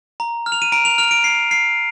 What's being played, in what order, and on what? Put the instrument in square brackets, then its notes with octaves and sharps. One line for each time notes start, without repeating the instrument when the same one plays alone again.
[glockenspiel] A#5
F6
F7
D#7
A#5 D7
F7
F6 F7
D7
A#5 C7
F6 C7